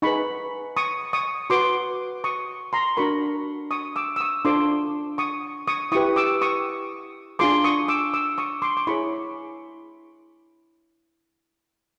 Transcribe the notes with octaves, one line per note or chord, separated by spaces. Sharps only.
D#4 G#4 B4 B5 C#6
C#6 D#6
C#6 D#6
F#4 B4 C6 D6
C#6 D#6
A#5 C6
D4 F#4 A#4 B5 C#6
C#6 D#6
D6 E6
E6
C#6 D#6
D4 F4 A4 C5 C6 D6
C#6 D#6
C#6 D#6
E4 G4 B4 C#6 D#6
D6 E6
C#6 D#6
D4 F4 G#4 C6 D6
C#6 D#6
D6 E6
D6 E6
C#6 D#6
C6 D6
D6
E4 G#4 C#5 B5 C#6